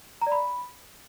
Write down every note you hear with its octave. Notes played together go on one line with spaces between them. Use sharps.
A#5
D5
B5